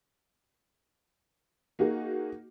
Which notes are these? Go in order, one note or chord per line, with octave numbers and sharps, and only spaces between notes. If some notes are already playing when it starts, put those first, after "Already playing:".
A#3 D#4 F#4 G#4